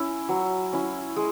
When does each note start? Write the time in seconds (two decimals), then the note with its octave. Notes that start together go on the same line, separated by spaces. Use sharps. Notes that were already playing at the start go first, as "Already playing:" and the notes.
Already playing: C#4 E4
0.29 F#3
0.73 C#4 E4
1.16 G#3